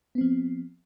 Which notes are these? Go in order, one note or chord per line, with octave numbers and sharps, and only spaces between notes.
F3 B3 C4